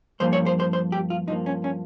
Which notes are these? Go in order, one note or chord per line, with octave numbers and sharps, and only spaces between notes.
G2 F3 A#3 C5
C#5
C5
C5
C5
G4
F4
G2 F3 A#3 D#4
C#4
C#4